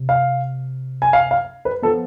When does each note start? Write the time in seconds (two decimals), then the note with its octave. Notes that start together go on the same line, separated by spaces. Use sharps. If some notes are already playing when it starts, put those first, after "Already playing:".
Already playing: C3
0.09 F5
1.02 G#5
1.13 F5
1.31 F5
1.65 B4
1.82 F3 B3 A4